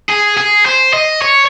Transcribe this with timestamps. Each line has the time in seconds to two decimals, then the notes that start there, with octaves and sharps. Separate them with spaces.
0.10 G#4
0.38 G#4
0.66 C5
0.93 D#5
1.22 C#5